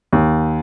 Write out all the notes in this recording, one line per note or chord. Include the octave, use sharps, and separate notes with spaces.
D#2